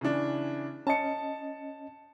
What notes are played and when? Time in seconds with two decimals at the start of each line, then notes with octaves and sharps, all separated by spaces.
0.01 C#3 E3 D4
0.87 C#4 D#5 A5 C#7